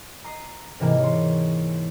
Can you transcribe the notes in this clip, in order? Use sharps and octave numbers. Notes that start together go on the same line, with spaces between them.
A#5 D#6 C7
G#2 C3 E3 A#3
C#5 C6